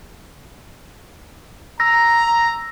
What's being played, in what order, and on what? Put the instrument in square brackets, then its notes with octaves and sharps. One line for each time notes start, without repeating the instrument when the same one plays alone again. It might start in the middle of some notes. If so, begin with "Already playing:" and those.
[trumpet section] A#5 [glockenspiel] E6 A#6